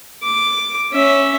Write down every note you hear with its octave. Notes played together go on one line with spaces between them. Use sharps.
D6
C#4 E5